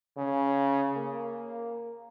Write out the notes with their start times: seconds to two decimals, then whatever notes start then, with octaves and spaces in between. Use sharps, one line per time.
0.17 C#3
0.96 A#3